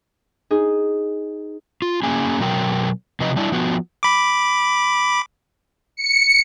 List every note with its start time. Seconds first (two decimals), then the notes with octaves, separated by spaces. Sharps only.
0.51 D#4 G#4
1.82 F4
2.03 A#3 C#4 G#4 G#5
2.40 B2 F#3 A#4 G5
3.20 C3 F3 F#3 B4 D#5
3.36 G3 D4 E4
3.52 F3 B3 F#4
4.03 B5 D6
5.96 C#7